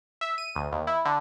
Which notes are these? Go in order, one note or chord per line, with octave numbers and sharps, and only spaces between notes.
E5
D#7
D2
D#2
E4
D3